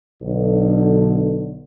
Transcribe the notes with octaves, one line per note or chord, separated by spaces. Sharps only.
B1 D3